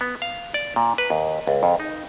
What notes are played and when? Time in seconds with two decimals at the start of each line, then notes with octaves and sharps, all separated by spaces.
0.01 B3
0.22 F5
0.54 D5
0.76 A#2
0.98 B4
1.10 D#2
1.47 C#2
1.63 F2
1.80 D#4